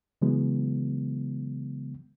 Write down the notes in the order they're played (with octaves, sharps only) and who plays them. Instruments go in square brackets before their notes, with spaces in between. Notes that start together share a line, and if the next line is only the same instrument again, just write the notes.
[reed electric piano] C#3 E3 F#3 G#3 B3